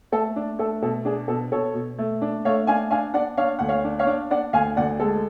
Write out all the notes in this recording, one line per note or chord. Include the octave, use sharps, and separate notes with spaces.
A3 A4
D4
A3 A4
B2 A4
D4 G#4
B2 A4
B2 A4 C#5
B2
A3
D4
A3 C#5 F5
D4 F5 G#5
D4 F5 G#5
D4 D5 F#5
D4 C#5 F5
D2 F#5
C#5 F5
D4
C#5 F5
D4
D4 D5 F#5
D2 F5 G#5
D2 D5 F#5
G#3 A4